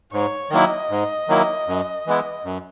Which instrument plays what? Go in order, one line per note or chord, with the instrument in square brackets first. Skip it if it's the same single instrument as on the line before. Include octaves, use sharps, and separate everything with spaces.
[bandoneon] G#2 [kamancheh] C#5
[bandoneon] D#3 F#3 A#3 E4 [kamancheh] D#5
[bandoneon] G#2
D#3 F#3 A#3 E4
F#2
E3 G#3 B3 E4
F#2